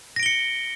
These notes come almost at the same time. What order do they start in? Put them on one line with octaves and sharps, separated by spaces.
A#6 D7 G7 C#7